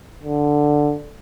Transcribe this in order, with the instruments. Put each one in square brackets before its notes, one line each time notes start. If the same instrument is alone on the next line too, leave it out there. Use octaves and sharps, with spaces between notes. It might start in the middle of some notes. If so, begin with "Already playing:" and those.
[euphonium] D3